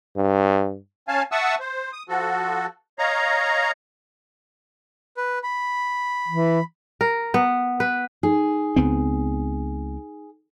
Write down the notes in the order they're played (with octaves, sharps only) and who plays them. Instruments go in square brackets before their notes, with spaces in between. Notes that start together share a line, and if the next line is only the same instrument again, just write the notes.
[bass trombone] G2
[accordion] C#4 F5 G#5 A5
E5 F#5 A5 C#6 D#6 E6
C5
D#6
F3 F#4 A4
C#5 D#5 F5 A#5
[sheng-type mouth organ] B4
B5
[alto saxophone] E3
[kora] A#4
B3
B4
[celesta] D#4 [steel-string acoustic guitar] G#4
[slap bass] C#2 B3 C4